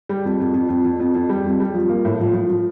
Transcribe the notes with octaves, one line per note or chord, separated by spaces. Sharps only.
G3
F2
F2
F2
F2
F2
F2
F2
G3
F2
G3
F3
A#3
A2
F3
F3
F3